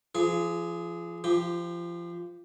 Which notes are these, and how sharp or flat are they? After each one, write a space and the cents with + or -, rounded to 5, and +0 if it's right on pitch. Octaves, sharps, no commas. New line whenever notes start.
F3 -30 G#4 +20
F3 -25 G4 +0